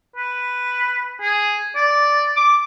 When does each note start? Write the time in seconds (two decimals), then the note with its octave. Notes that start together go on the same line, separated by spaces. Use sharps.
0.16 B4
1.21 G#4
1.76 D5
2.36 D6